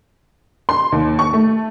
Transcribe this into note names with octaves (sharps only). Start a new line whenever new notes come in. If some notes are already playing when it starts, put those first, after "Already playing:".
C6
D#2
C#6
A3